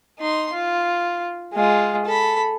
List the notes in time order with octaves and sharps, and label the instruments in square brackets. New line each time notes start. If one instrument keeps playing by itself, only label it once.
[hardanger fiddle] D#4 C6
F4
G#3 F4
A4 B5